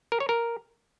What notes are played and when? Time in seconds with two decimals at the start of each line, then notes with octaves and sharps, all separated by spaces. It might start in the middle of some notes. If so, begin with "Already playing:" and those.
0.12 A#4
0.20 C#5
0.29 A#4